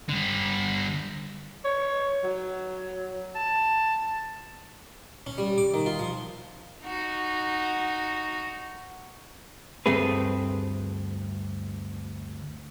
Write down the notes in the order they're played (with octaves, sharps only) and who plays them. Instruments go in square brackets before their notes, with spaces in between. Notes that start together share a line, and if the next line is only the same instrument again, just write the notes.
[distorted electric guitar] D3 G3
[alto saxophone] C#5
F#3
A5
[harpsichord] C#4
G3
D6
D#3
F4
F3
[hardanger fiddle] D#4 F#4
[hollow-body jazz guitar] D2 G2 A3 C4 G#4 B4